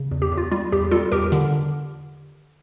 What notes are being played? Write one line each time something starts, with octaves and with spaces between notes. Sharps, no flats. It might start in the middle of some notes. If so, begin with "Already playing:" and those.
Already playing: C#3
E2
G4
E2
F4
G3 F4
E2 G4
G3 F4 A4
E2 G4 A#4
D3